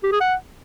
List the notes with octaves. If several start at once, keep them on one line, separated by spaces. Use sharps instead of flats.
G4
G#4
F#5